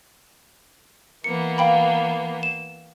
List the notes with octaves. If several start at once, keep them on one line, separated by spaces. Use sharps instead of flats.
E3 A#3 B3 C#7
F5 G5 B5
E7